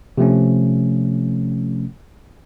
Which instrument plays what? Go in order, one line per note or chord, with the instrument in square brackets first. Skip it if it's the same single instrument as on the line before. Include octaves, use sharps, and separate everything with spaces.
[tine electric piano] C3 F3 A3 C#4